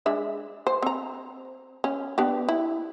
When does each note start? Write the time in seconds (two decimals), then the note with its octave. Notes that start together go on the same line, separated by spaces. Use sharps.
0.06 G#3 D4 E5
0.67 C5
0.82 C4 A#5
1.84 C#4
2.18 B3 D4 G4
2.49 E4